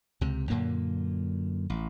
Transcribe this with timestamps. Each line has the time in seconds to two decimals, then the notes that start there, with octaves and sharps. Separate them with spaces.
0.21 C#2 C3
0.50 F#2 A#2 D3 A#3
1.70 A1